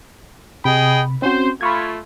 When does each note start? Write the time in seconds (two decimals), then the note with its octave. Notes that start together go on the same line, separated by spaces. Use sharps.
0.64 C3 G#4 D#5 G5 B5
1.22 C4 C#4 F#4 C5
1.61 A3 F4 B5 C#6 G#6